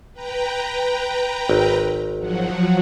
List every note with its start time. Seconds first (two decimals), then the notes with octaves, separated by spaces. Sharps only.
0.13 B4 G5 A#5
1.49 G#1
2.19 F3 F#3 F#4